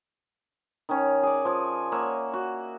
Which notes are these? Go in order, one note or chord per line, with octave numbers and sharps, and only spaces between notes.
D#3 C#4
G#4 D5
F3 G#5
A#3 C#5 E5 F#5
F#4